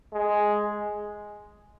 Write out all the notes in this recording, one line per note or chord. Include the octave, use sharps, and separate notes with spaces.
G#3